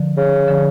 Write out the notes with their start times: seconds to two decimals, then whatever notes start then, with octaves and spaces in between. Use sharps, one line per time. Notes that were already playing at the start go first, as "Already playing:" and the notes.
Already playing: D3 F3
0.17 C#3
0.48 D3 F3